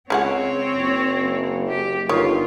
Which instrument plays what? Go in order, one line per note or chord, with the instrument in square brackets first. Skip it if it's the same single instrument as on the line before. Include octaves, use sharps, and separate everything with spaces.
[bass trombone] C#2 [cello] C4 C#5 [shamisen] C#4 G#4 F#5
[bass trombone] F#1
[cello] G4
[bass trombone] G1 [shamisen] D#3 C#5 [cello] F4